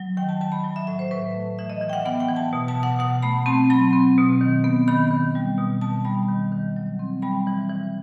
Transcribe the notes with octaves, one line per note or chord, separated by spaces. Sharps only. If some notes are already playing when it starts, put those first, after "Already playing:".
Already playing: F#3
D#3 G5
A5
D#3 A5
B5
F#3
E5
A2 E5
C5
A2 B4
A3
E3 E5
D#5
E3 E5
G5
F#5
B3 F#5
G5
E3
A5
B2
A5
B2
F#5
B2 F#5
A3 B5
C4 A5
F#3 B5
C4
B2
D#3
B3
D#3 B5
D#3
G3
B2
B2 A5
G3 B5
D#3
D#3
F#3
C4
G3 B5
E3
E3